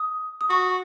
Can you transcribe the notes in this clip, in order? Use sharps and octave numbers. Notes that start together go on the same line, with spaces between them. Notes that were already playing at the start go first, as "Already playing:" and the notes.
Already playing: D#6
D#6
F#4 C#6